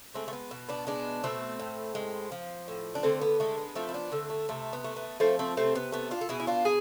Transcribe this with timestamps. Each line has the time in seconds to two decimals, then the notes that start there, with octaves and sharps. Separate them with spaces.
0.14 G#3 A3 C4
0.28 A3
0.33 B3
0.51 B2
0.69 B3 D4
0.87 G#3 B3 D4
1.24 B2 A3 C4
1.59 A2
1.95 G#3
2.32 F3
2.68 A2
2.95 D4
3.03 D3 A3 C4
3.21 B3
3.40 G#3 A3
3.58 B3
3.75 F3 A3 C4
3.89 E4
3.94 B3 D4
4.12 D3 A3 C4
4.30 A3
4.49 C3 A3
4.73 B3
4.84 A3
4.96 B3
5.20 F3 A3 C4
5.39 A3 C4
5.57 C3 A3 C4
5.75 B3
5.92 A3 B3
6.11 D4 F4
6.21 A4
6.29 B2 E4 G#4
6.40 E4
6.47 D4 F4
6.65 G#4